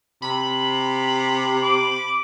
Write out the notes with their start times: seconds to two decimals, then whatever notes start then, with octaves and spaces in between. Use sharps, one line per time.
0.22 C3 B5
1.63 D6